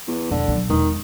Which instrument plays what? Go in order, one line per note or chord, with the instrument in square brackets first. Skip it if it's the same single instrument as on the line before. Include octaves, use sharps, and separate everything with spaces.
[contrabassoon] E2
[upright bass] E1 [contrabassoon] D3
[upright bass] B2 F#3
[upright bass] E1 [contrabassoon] D#3